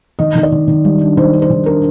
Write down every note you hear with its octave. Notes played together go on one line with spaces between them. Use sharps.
D#3 D#5
D#3
D5
D#3
D#3
G3
D4
D#3 C5
D4
C5
D#3
D4 A#4